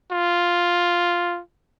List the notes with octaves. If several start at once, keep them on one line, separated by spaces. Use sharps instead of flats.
F4